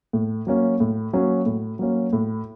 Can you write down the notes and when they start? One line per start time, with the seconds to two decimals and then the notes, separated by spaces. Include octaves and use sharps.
0.13 A2
0.47 F#3 A#3 C#4
0.80 A2
1.13 F#3 A#3 C#4
1.46 A2
1.79 F#3 A#3 C#4
2.13 A2